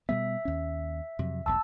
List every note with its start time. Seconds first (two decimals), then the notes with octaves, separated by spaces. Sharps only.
0.09 B2 G3 B3 E5
0.45 D#2 C#4
1.19 F2 C3 F#3
1.46 E1 B1 E2 A5 E6